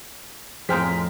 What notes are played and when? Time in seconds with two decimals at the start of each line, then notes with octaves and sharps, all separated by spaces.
0.69 F2 A2 G#4 C5 G5 A#5 F6 B6